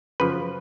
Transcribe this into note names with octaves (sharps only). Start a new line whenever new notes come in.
F#2 C#3 F3 B4